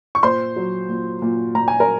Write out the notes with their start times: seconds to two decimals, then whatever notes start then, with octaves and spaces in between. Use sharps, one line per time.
0.15 C#6
0.23 A#2 C5 C6
0.56 F#3
0.89 A#2
1.22 A#2
1.55 A#2 A#5
1.68 G#5
1.80 A#4 A#5